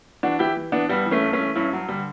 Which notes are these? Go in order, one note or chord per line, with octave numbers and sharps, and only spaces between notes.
E3 D4 F#4
E3 E4 G4
E3
E3 B3 D4
G2 G3 B3
E3
A3 C#4
G2
A3 C#4
E3
G2 C#4 E4
G2 F#3
D3 G3